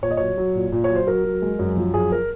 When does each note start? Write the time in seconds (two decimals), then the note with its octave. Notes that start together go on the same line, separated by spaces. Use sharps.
0.03 A#2 C#5
0.11 D#5
0.17 F#3 C#5
0.38 F#3
0.55 A#2
0.72 A#2
0.84 C#5
0.89 F#3
0.96 C5
1.07 F#3 A#4
1.24 F#3
1.42 G#3
1.59 F#2
1.77 F3
1.94 F#2 G#4
2.12 A#4